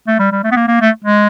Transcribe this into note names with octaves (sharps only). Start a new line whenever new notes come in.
A3
G3
G3
A3
B3
A#3
A#3
A3
G#3